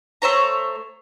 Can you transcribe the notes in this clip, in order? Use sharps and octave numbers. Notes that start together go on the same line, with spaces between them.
A3 C5 C#5 A#5